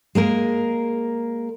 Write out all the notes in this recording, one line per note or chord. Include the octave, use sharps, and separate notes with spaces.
G#3 A#3 A#4